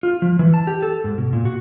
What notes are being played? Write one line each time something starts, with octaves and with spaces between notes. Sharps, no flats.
F4
F3
E3
A5
G4
A4
G#2
B2
A#2
F#4